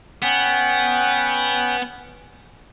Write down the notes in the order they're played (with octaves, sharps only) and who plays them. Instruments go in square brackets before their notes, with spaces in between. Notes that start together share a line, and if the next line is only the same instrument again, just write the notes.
[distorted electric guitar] B3 [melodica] C#4 F#5 G5